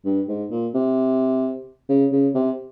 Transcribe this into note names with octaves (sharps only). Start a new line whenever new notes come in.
G2
G#2
A#2
C3
C#3
C#3
C3